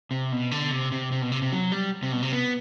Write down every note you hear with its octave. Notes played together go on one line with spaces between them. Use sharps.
C3
B2
D3
C3
C3
C3
B2
C3
C3
F#3
G3
C3
B2
C3
B3